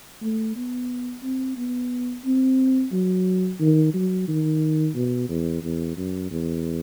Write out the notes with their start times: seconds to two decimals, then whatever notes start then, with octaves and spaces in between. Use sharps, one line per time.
0.22 A3
0.56 B3
1.23 C4
1.57 B3
2.25 C4
2.92 F#3
3.60 D#3
3.94 F#3
4.28 D#3
4.95 B2
5.29 E2
5.63 E2
5.97 F#2
6.31 E2